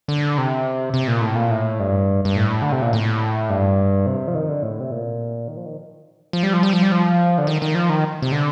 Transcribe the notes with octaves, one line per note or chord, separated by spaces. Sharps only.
D3
C3
C3
A#2
A2
A#2
A2
G2
G2
A2
D3
C3
A#2
A2
G2
C3
F3
D#3
D3
A2
C3
A#2
D#3
F3
D#3
F3
G3
F3
G3
F3
G3
F3
D3
D#3
D#3
F3
D#3
C3
D3